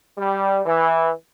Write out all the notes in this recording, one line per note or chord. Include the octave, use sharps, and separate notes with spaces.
G3
E3